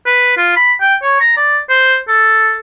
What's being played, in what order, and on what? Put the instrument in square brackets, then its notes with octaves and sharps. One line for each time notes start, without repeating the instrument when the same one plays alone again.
[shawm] B4
F4
B5
G5
C#5
A#5
D5
C5
A4